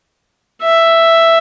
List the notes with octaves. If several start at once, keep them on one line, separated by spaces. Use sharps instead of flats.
E5